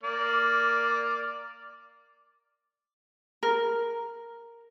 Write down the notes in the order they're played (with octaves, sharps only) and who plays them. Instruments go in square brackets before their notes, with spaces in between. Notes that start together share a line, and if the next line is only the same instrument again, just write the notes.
[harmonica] A#3 D5 F6
[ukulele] A#4